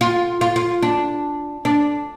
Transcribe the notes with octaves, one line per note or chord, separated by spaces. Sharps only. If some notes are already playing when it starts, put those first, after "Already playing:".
F4
F4
F4
D4
D4